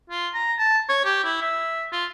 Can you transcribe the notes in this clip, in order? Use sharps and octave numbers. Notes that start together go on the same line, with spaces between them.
F4
A#5
A5
C#5
G4
E4
E5
F4